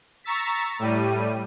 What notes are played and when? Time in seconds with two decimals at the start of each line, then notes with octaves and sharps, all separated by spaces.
0.24 A#5 C#6 E6 A6 B6
0.79 A2 G3 D#7